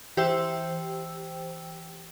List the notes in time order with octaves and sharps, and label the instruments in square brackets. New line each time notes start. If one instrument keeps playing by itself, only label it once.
[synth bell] E3 G4 C5 G5 E6